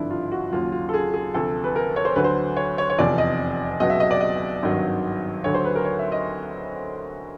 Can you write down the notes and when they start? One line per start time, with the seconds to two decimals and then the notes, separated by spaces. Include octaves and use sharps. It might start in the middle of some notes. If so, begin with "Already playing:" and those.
Already playing: G#1 G2 D3 F3 D4 E4
0.11 F4
0.32 F#4
0.52 D#2 C#3 F#3 F4
0.72 F4
0.89 A4
0.94 G#4
1.14 G#4
1.34 D2 C3 F3 A4
1.64 B4
1.76 A#4
1.96 C#5
2.05 C5
2.16 D2 D3 F#3 B4
2.24 C5
2.57 C#5
2.78 C#5
2.90 C#5
2.98 F1 E2 C3 F3 D5
3.18 D#5
3.80 C#2 B2 F#3 D#5
3.90 E5
4.00 D#5
4.11 D5
4.21 D#5
4.63 G#1 G2 D#3 F#3
5.44 D2 D3 F#3 C#5
5.54 C5
5.65 B4
5.75 A#4
5.85 C#5
5.99 E5
6.12 D#5